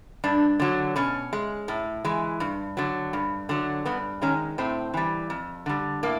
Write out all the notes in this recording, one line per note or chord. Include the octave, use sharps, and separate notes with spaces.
G2 D4
D3 F#3
B2 C#4
G#3
A2
E3 G#3
G2
D3 F#3
G2
D3 F#3
G2 B3
D#3 G#3 C#4
A2 C4
E3 G3
F2
D3 G3
A2 A#3